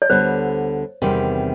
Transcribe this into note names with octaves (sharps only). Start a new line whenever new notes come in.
C#5
D2 D3 G3 B3 C5
E2 C3 D#3 G3